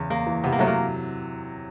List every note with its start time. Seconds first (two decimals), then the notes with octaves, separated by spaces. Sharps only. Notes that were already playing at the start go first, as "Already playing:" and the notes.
Already playing: E2 C#3
0.10 E2 A#3
0.27 E3
0.44 C3 B3
0.52 A#3
0.59 F#3 A3
0.67 A#3